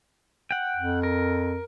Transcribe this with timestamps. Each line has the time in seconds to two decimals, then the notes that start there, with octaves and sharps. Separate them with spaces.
0.51 F#5 G5
0.76 F2
1.03 A#4